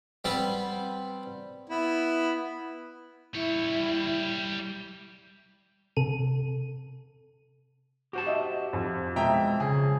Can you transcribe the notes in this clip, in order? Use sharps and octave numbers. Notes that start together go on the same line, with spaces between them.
G3 B3 C4 B4
B3 E4
G3 E4 C#5
C3 A4 D#7
F#4 G4 C5 A5
D#5 E5
F2
B2 G#3 E5 G5 A#5
C#3 G#4